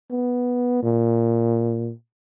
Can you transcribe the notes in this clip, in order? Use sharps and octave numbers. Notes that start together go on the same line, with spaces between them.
B3
A#2